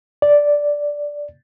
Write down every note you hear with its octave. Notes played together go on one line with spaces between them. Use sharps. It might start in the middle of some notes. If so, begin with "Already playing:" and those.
D5